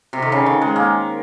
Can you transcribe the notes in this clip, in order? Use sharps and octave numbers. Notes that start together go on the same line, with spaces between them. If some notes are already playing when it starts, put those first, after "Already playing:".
C3
D#3
C#3
D#3
G#3
A#3